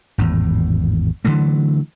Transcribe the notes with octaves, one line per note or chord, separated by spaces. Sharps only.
G#1 E2 A2
D3 E3 F#3 A3